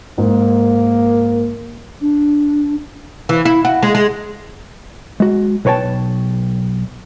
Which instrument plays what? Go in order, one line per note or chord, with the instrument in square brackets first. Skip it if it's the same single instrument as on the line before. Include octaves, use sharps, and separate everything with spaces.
[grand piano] G#2 [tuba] A#3
[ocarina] D4
[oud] E3
E4
F#4
G#3
G#3
[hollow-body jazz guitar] G#3 F#4
B1 B4 C#5 G5 A5